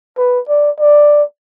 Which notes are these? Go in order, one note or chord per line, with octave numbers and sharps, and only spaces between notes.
B4
D5
D5